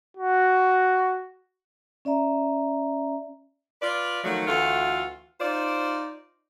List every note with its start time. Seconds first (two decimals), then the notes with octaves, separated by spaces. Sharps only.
0.17 F#4
2.05 C#4 D5 E5 A#5
3.82 F4 B4 D5
4.24 D#3 F3 F#3 A3 F#4
4.48 D2 E3 F4 F#4 A4
5.40 D#4 F4 C5 D5